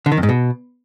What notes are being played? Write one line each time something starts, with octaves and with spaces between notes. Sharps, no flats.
D3
D#3
F2
G#2
B2